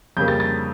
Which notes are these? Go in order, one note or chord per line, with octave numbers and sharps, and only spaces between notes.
F2 C#3 G3 A#3 G6
A6
A6